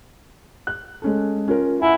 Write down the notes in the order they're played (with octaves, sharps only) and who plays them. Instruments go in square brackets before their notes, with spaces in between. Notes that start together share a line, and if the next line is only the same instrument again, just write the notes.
[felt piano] F#6
G#3 C#4 A4
C#4 F4 A#4
[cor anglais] E4 [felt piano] F#5 G#5